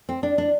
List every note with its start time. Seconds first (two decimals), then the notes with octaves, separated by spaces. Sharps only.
0.09 C4
0.23 D4
0.38 D4